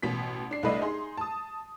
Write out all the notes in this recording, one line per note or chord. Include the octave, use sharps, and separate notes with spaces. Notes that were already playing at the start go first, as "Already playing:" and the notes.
A1 B2 B6
D4 C7
C2 A3 D4 E4 B4 D#5
D#4 G#4 C6
A5 D#6